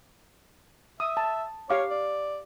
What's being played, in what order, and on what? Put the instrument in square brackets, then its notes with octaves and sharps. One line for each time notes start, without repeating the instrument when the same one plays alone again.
[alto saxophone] E5 [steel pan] D#6
[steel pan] A5
[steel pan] G4 F5 D6 [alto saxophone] C#5
[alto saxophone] D5